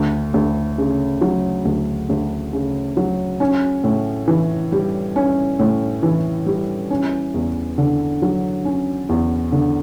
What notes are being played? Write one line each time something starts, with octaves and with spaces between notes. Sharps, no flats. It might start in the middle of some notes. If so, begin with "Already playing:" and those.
Already playing: D2
D2
C#3
F#3
D2
D2
C#3
F#3
C#4
A2
E3
G3
C#4
A2
E3
G3
C#4
E2
D3
F#3
C#4
E2
D3